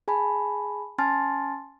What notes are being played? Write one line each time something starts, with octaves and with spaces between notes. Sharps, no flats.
G#4 G#5 A5 B5
C#4 G#5 A5 C6 F6 A6